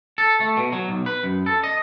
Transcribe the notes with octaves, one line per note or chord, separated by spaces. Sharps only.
A4
A3
B2
F#3
B1
B4
F#2
A4
D#5